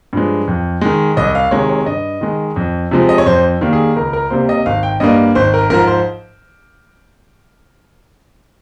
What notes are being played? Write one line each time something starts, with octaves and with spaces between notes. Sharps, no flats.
G2 F3 G#3
F2
D#3 G#3
C2 D#5
F5
C3 D#3 G#3 C#5
C#5
G2 D#5
D#3 G#3
F2
C3 F3 G#3
D#5
C#5
F2 C5
D#3 G3 A#3
G#4
C#2 A#4
A#4
C3 G3 A#3 C5
D#5
G#1 F5
G5
G2 G3 A#3 D#5
G#1 C5
A#4
G#2 F3 A#4
C5